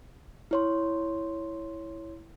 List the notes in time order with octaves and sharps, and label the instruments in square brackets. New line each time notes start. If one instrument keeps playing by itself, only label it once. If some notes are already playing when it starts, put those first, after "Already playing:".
[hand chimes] E4 C#5 C6